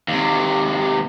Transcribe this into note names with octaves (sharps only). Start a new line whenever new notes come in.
D#2 C3